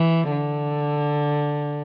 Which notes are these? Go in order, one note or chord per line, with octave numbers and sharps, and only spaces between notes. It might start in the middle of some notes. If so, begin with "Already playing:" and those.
Already playing: E3
D3